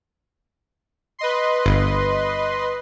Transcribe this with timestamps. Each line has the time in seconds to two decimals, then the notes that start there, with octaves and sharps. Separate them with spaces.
1.19 B4 D#5 C6
1.66 G1